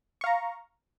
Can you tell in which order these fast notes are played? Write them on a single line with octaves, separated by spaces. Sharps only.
C#6 F5 A#5